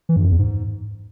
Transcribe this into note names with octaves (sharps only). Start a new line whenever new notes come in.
E3
G2
F#2
E2
G#2